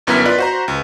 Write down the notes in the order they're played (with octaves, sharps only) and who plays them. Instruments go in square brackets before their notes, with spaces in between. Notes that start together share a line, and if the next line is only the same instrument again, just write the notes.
[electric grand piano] G1 F#2 B3 E4 A#4 B6
F4 B4 D5 D#5
F#4 C5 A#5
C#2